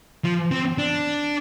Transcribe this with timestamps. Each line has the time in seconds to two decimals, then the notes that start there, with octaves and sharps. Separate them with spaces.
0.25 F3
0.51 C4
0.78 D4